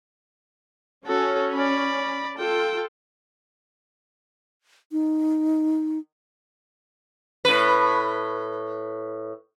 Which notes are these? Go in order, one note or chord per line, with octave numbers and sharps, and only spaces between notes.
C#4 F#4 A4
D5 B5
F4 A4 G5
D#4
A2 B4